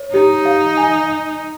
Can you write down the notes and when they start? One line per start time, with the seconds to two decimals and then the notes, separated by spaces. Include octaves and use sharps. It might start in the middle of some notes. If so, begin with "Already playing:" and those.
Already playing: C#5
0.14 D#4 G4
0.46 F5
0.77 G#5